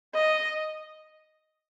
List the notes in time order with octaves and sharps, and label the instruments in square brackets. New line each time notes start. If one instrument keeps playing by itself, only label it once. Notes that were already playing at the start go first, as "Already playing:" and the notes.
[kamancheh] D#5